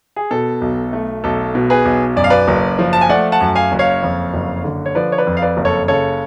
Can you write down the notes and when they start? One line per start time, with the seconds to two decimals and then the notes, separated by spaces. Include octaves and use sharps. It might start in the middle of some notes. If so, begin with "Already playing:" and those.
0.16 G#4
0.31 B2 A4
0.61 B1
0.93 A3
1.24 B1 A4
1.55 B2
1.70 G#4 B4
1.85 B1
2.16 F#2 D5
2.24 F5
2.30 B4 D5
2.48 F#1
2.79 F3
2.93 A5
3.01 G#5
3.09 A3 D5 F#5
3.32 F#5 A5
3.41 F#2
3.55 F5 G#5
3.72 F#1
3.79 C#5 F5
4.03 F2
4.34 F#1
4.64 D3
4.86 C#5
4.95 F3 B4 D5
5.12 C#5
5.18 B4 D5
5.27 F2
5.37 F5
5.42 B4 D5
5.57 F#1
5.65 A4 C#5
5.88 C#3 A4 C#5